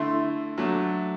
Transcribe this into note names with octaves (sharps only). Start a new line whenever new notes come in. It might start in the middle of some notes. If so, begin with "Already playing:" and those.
Already playing: D3 A3 E4 C6
F#3 A3 D4